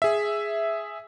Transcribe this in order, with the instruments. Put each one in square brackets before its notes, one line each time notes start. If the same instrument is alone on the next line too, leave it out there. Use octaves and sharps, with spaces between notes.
[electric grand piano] G#4 E5